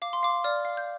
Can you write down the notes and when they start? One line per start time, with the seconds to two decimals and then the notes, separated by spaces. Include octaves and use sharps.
0.02 F5 D6
0.13 C6
0.23 F5 D6
0.44 D5 F6
0.65 F5
0.77 G6